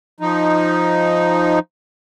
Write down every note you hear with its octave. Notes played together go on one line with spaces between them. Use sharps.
F3 D#4